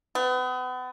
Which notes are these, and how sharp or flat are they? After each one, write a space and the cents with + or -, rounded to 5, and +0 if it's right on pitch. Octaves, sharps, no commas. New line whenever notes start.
B3 +35